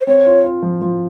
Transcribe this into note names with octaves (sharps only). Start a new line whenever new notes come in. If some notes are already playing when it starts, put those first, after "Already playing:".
C5
C4 C#5
F4
F4
F3
F3